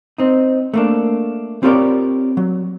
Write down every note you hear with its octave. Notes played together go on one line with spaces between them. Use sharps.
C4 D#4
A3 A#3 D4
C4 F4 G4 A#4 C#5 D5
F#3